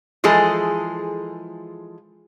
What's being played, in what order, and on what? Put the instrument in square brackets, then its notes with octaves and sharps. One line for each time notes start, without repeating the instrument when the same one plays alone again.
[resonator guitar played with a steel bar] E3 F3 G#3 G#4 A4